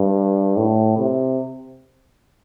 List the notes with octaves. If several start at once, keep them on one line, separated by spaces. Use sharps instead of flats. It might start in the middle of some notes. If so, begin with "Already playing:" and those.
Already playing: G2
A2
C3